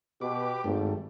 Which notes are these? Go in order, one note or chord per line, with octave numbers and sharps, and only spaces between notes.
B2 G4 B4 D6
G#1 G2 A3